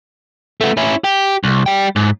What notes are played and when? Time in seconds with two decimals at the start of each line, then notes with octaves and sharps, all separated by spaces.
0.61 A3 B3
0.77 C#4 E4
1.04 G4
1.44 C2
1.66 G3 G5
1.96 G#2